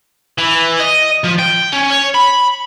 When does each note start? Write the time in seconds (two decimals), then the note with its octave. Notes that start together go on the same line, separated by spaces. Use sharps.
0.38 E3
0.80 D#5
1.24 F3
1.39 G5
1.73 C#4
1.90 C#5
2.15 B5